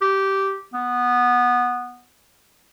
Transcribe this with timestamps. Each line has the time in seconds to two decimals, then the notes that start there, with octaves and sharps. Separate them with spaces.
0.02 G4
0.74 B3